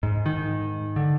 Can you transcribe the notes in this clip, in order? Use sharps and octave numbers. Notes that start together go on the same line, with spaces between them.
G#2
D#3
D3